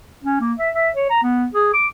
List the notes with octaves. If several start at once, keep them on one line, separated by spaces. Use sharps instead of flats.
C#4
A#3
E5
E5
C#5
A#5
B3
G#4
D6